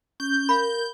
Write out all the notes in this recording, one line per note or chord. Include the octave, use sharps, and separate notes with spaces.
C#4 G6
A#4 F5 B5